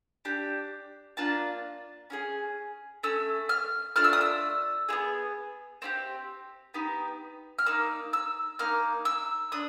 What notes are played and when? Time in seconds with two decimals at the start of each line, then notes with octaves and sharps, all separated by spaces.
0.25 D4 G4
1.17 A#3 D4 F4 A5
2.10 C#4 F4 G#4
3.03 A3 C#4 E6
3.49 F6
3.96 A3 D4 F4 F6
4.04 E6
4.13 D#6
4.21 E6
4.89 E4 G#4
4.93 B3
5.82 C4 E4 G4
6.74 B3 D#4 G4
7.59 F6
7.66 A#3 D#4 E6
8.13 E6
8.59 A#3 D#4 F6
9.05 E6
9.52 D4 D#6